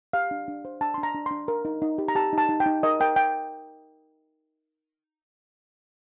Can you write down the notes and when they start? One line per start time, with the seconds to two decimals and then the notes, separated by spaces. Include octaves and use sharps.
0.13 G4 F5
0.31 D4
0.48 D4
0.65 C5
0.81 D4 A5
0.94 D4 C6
1.03 A#5
1.15 D4
1.26 D4 C6
1.48 A#4
1.65 D#4
1.82 D#4
1.98 G4
2.08 A#5
2.15 G4 A5
2.33 D#4 A5
2.49 D#4
2.60 G5
2.66 D#4
2.83 A#4 D#5
3.00 A#4 G5
3.16 G5